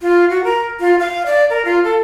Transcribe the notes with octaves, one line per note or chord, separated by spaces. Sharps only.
F4
F#4
A#4
F4
F5
D5
A#4
F4
A4